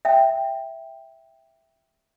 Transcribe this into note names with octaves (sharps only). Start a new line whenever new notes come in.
E5 G5